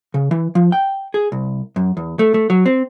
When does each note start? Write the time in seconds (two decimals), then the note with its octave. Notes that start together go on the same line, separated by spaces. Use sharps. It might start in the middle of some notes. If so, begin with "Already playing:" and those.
0.14 C#3
0.31 E3
0.55 F3
0.72 G5
1.14 G#4
1.32 C2
1.76 F#2
1.97 E2
2.19 A3
2.34 A3
2.50 F#3
2.66 C4